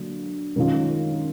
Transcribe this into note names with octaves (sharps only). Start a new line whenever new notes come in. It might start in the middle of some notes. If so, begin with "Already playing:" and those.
Already playing: D3 F#3 A#3
F#2 D#3 G#3 C#4 F4